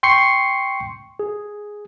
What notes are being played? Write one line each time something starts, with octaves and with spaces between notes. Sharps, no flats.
G5 C6 C#6 C7 C#7
G#4